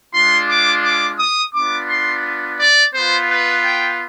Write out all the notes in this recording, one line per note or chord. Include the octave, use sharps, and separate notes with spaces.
G#3 D4 F4 C6
D6
D6
D#6
B3 D4 F4 D6
C6
D5
B3 F4 C5
B4
G5